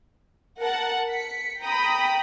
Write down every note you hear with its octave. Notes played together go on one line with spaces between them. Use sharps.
A#4 F#5 A5
B6 C#7
G5 A#5 B5 D#6